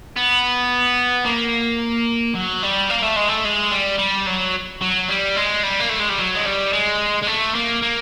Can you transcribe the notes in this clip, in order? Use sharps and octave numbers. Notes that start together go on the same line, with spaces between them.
B3
A#3
F#3
G3
A#3
A3
G#3
A3
G#3
G3
G3
F#3
F#3
G3
G#3
G3
A#3
A3
G#3
G3
F#3
G#3
G3
G#3
G#3
A3
A#3
A#3